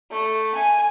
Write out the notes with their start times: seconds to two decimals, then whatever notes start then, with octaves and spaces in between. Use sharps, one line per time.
0.11 A3
0.55 G#5